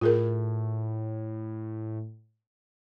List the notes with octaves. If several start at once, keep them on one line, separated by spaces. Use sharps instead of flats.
A2 F4 G#4 A#4